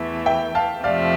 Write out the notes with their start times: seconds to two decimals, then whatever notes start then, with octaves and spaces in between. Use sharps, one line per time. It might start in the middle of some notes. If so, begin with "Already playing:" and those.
Already playing: E2 E3 A3
0.26 E5 G5
0.55 F5 A5
0.84 F2 C3 F3 A3 D5 F5